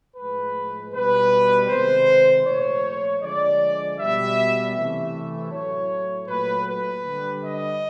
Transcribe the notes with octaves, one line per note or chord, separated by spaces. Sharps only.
A2 F3 G#3 B4
B2 G3 B4
C3 D#3 G#3 C5
A#2 F3 A3 C#5
D3 F3 G#3 D5
B2 G3 E5
C3 E3 A3
A2 F#3 A3 C#5
A#2 F#3 A3 B4
B4
D3 G3
D#5